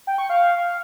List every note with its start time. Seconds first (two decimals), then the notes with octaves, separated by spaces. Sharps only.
0.07 G5
0.18 C#6
0.29 F5